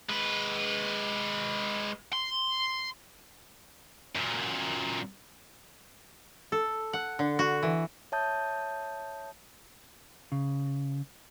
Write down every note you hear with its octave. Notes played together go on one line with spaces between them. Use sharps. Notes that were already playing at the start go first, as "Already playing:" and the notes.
G#3 B4
C6
F#2 A#2
A4
F#5
D3
F#4
E3
C#5 E5 A5 D#6 G6
C#3